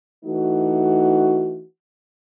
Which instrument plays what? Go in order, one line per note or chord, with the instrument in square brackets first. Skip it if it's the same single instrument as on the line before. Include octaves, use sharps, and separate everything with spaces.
[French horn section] E3 A3 D#4 F#4